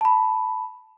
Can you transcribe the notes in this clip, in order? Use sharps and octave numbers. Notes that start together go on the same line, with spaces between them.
A5 B5